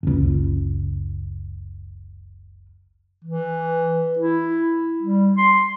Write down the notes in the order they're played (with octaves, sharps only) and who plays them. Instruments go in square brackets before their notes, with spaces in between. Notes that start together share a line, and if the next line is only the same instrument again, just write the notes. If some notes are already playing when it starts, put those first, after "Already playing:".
[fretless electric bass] F#1 C#2
[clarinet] E3
E4
G3
C6